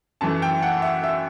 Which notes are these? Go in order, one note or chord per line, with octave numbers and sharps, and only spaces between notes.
F#2 E3 A3 A5
G5
F#5
E5
E5